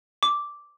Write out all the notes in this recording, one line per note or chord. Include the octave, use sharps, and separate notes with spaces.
D6